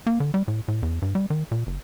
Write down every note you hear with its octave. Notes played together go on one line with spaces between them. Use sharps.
A#3
D3
G3
A2
A2
E2
G2
G3
D#3
A#2
F#1